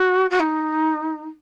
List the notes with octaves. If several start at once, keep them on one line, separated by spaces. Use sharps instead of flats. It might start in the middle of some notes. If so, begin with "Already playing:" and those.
Already playing: F#4
F#4
D#4